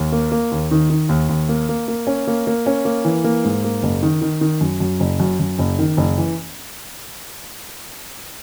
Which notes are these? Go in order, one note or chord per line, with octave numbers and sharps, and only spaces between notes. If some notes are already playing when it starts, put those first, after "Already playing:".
Already playing: D#2
A#3
A#3
D#2
D#3
D#3
D#2
D#2
A#3
A#3
A#3
C#4
A#3
A#3
C#4
A#3
E3
A#3
G#2
A#3
F#1
D#3
D#3
D#3
F#2
F#2
F#1
F#2
F#2
F#1
D#3
F#1
E3